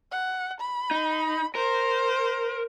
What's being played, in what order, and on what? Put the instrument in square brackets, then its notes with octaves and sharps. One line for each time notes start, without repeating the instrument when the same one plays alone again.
[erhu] F#5
B5
[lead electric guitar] D#4
[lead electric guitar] A#4 [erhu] C5